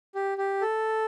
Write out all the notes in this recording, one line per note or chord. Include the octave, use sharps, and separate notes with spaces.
G4
G4
A4